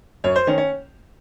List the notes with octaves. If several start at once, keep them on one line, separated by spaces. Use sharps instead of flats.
F#2 C#5
C5
D#3 C#4
C#4